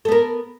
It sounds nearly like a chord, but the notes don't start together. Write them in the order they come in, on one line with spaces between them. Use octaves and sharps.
A4 B3 A#4